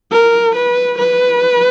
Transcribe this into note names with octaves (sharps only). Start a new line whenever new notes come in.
A#4
B4
B4